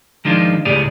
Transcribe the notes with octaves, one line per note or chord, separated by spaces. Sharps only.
D#3 F3 G#3 D4 F4
C#2 A2 G4 G#4 D5